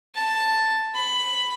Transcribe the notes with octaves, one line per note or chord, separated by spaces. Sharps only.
A5
B5